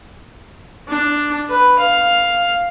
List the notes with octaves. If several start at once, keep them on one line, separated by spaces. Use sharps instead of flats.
D4
B4
F5